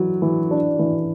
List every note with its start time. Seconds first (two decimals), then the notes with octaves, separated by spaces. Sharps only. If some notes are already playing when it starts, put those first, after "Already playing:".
Already playing: E3 F#3 F#4
0.22 E3
0.51 D4
0.79 E3